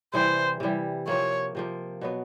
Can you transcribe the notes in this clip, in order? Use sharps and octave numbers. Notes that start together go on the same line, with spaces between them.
C3 E3 G3 C5
C3 E3 G3
C3 F3 A#3 C#5
C3 F3 A#3
B2 F#3 B3